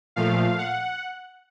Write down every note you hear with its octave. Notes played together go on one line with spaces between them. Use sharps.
A#2 F3 A3 F5
F#5